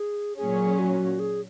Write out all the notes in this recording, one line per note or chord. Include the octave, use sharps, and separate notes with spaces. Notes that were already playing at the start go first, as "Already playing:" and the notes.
Already playing: G#4
A#2 F#3 C#4 G#4
F#4
G#4